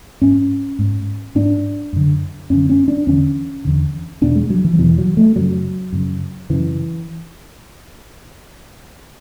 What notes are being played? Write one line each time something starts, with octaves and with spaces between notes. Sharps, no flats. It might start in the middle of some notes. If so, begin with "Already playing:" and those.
G#2 C#4
G#2
G#2 D4
F#2 D3
F#2 D3 C#4
C#4
D4
E2 D3 C#4
E2 D3
E2 B2 D4
G#3
F#3
E3
E2 B2 E3
F#3
A3
F#2 C#3 F#3
F#2 C#3
F#2 C#3 E3